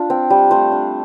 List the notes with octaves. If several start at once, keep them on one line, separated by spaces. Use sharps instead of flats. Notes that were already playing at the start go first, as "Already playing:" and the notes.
Already playing: D4 F4
C4
G3
A3 C5
D4